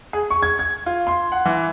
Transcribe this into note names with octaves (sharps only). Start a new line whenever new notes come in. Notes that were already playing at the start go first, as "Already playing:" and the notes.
G#4
C#6
G#6
G#6
F4
C6
F#5
E3